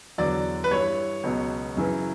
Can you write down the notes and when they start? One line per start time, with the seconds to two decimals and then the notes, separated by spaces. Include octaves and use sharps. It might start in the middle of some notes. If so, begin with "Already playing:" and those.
0.18 E2 D3 F#3 D5
0.64 B4
0.71 G2 E3 C#5
1.23 C#2 B2 F#3
1.77 F#2 C#3 E3